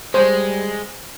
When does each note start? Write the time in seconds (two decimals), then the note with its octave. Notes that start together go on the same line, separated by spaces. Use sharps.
0.14 G3 G#3 C5